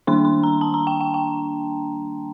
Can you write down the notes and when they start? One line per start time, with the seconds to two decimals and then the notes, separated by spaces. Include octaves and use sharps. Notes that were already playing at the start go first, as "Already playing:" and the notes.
0.07 D#3 G3 A#3 D4 C6
0.25 C6
0.43 A#5
0.61 A5
0.74 A#5
0.87 G5
1.01 G5
1.14 G5